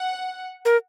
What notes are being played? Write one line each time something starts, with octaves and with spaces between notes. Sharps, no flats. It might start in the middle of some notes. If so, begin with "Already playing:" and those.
Already playing: F#5
A#4